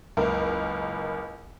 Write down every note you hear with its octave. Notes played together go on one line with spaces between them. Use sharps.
F#1 C#2 A#4